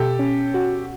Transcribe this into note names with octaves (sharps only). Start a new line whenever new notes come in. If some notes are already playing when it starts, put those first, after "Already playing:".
Already playing: B2 G4 A4
C#4
F#4